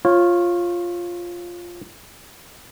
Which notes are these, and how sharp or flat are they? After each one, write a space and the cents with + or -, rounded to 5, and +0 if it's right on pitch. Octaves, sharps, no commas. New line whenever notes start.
F4 +0 C#5 -25